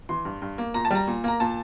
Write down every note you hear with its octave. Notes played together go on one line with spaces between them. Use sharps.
E3 C6
G2
G2
A#3
A#2 A#5
A5
G3 A#5
A#2
A#3 A#5
A#2 A5